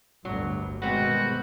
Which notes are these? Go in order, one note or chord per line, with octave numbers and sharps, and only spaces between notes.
G1 D2 G2 F#3
G2 B2 D#3 G#3 B3 C4 F#4